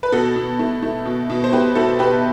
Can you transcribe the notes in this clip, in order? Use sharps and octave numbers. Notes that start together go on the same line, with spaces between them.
B4
B2 F#4 A4
B2
A3
A3
B2
B2
C5
A3 G4 B4
A3 F#4 A4
B2 G4 B4